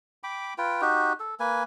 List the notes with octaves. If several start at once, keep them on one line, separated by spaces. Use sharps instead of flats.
G5 B5 D6
F4 B4 G5
D#4 F#4 G4
A4
A#3 B4 G#5